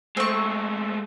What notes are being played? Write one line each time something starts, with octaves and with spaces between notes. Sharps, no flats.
G#3 A3 C4 C#6